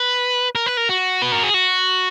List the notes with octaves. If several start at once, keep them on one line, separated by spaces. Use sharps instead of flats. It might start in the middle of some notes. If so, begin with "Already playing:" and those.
Already playing: B4
A#4
B4
A#4
F#4
B4
A#4
G#4
F#4